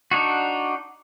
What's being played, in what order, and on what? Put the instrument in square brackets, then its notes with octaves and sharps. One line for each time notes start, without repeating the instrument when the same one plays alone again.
[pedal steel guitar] D4 D#4 F#4